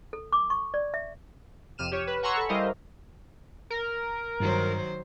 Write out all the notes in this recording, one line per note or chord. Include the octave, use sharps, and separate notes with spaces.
A4
D6
C#6
D5
E5
F2 C3 F6 D#7 E7
G4 C#5
B4
F#5 G#5 A#5 C6 C#6 E6
A4 B5 C#6
G3 E4 A#4 C5 D#5 F5
A#4
G2 D#3 F#3 C5